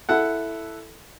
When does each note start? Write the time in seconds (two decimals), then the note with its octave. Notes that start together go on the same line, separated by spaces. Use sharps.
0.09 E4 A4 F#5